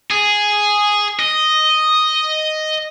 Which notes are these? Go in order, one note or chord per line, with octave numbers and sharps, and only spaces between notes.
G#4
D#5